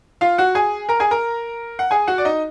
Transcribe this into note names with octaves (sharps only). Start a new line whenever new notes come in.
F4 F5
F#4 F#5
G#4 G#5
A#4 A#5
G#4 G#5
A#4 A#5
F#5
G#4 G#5
F#4 F#5
D5
D#4 D#5